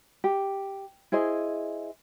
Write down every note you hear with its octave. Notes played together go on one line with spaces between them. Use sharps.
G4
E4 G#4 C5 D#5